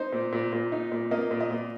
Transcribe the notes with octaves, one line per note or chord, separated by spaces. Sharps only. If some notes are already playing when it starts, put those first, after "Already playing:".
Already playing: D#4 C5
A#2
A#2
A#2
D#4
A#2
A#3 D#5
A#2
D#5
A#2